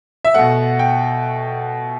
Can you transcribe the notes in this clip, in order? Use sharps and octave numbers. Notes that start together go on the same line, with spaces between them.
E5
B2 A3 F#5
G5